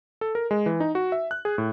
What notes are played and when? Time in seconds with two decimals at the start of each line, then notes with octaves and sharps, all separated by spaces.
0.21 A4
0.35 A#4
0.51 G#3
0.66 E3
0.80 D#4
0.95 F#4
1.12 E5
1.31 F#6
1.45 G#4
1.58 A2